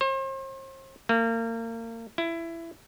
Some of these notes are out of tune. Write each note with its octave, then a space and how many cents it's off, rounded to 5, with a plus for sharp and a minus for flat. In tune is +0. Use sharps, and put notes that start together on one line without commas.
C5 +40
A#3 -35
E4 +20